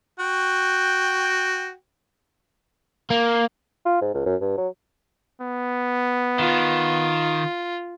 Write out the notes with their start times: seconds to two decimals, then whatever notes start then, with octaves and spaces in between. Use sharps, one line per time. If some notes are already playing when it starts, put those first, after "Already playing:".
0.19 F#4 G5
3.10 A#3
3.86 F4
4.01 G#2
4.14 C#2
4.26 F#2
4.41 G2
4.57 F#3
5.42 B3
6.39 D#3 F4